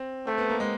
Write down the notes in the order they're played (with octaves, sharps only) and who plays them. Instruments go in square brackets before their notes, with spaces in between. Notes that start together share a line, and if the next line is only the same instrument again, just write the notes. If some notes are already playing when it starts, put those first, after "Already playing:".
Already playing: [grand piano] C4
[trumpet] A3 [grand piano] C4
[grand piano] B3
A#3
G#3